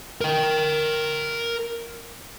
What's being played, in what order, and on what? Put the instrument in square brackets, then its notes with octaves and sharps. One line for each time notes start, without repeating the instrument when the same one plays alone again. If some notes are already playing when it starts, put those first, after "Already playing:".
[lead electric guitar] A#4 G5